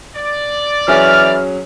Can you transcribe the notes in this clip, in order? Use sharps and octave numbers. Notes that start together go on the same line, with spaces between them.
D5
E3 F#3 C#4 G#4 F6